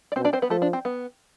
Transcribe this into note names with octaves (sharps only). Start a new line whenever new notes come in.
D5
B2 C4 C5
D4 D5
C4 C5
B3 B4
F3 A3 A4
D4
C4
B3